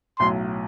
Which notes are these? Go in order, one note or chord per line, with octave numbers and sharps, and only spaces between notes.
B1 A2 F#3 C6